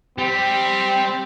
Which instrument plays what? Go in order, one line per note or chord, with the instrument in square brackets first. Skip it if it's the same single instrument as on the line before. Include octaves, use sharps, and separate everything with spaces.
[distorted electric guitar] G3 [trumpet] C4